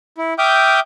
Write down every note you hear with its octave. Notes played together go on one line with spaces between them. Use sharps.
E4
E5 G5 D6 D#6 F6 G6